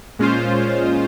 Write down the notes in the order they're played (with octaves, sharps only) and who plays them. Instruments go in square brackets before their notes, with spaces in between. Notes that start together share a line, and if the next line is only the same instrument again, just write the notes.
[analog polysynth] A#2 G#3 C#4 F4 C5